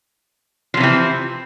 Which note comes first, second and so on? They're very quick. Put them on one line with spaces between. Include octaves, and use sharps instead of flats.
F3 C3 E3 C4